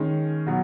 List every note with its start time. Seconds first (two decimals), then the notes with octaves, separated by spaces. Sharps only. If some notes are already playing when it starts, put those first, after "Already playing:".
Already playing: D#3 G#3 C#4
0.46 B2 F#3